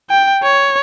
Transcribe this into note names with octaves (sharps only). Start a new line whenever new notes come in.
G5
C#5